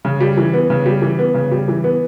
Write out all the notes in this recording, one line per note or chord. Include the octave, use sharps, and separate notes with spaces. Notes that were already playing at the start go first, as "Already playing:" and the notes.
C#3
G3
E3
B3
C#3
G3
E3
B3
C#3
G3
E3
B3